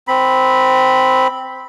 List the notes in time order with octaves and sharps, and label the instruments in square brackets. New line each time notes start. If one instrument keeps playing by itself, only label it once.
[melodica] C4 B5